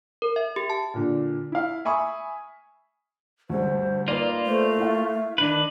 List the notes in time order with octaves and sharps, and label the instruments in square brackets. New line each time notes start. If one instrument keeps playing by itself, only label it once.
[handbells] A#4
E5
G4
A5
[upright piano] A#2 D3
E4 F5
E5 G#5 B5 C#6 D#6
[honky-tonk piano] D2 G2 [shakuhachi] C5
[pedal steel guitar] A#3 F4 [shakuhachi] D#4 [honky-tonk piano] B4 D5
[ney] A3 [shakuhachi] C5
[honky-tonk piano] E4 F5 [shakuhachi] E5
[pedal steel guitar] D#3 B4 [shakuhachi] D4